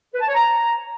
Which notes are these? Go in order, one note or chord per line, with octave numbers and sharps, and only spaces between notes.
B4
A5
C#5
A#5